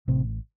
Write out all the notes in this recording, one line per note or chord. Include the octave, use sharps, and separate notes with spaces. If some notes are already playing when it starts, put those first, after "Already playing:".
A1 A2 C3 C4